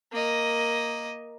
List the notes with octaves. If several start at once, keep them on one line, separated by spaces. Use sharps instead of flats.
A#3 D#5